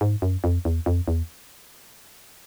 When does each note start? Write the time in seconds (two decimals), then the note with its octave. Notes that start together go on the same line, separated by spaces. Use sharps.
0.01 G#2
0.22 F#2
0.44 F2
0.65 E2
0.86 F2
1.08 E2